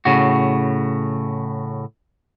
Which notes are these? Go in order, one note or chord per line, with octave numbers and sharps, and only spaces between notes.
A2 C#3 F#4